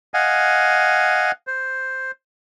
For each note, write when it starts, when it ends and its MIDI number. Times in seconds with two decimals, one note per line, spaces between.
0.14 1.31 75
0.14 1.31 77
0.14 1.31 78
0.14 1.31 80
1.47 2.11 72